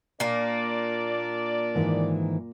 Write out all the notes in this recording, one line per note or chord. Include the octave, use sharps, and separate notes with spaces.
A#2 A#3 D4 A#4 D5
G#2 D#3 E3